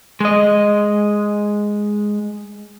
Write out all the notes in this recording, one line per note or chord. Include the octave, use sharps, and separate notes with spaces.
G#3 D#5